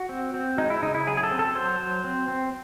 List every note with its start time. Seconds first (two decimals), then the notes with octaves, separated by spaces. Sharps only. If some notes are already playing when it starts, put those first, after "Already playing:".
Already playing: F#4
0.09 C4
0.34 C4
0.58 G#3 D#4
0.70 E4
0.83 C#3 D#4
0.94 E4
1.07 F#3 G#4
1.17 G#4
1.23 A4
1.31 C4
1.39 A4
1.55 F#3 C5
1.80 F#3
2.04 C4
2.28 C4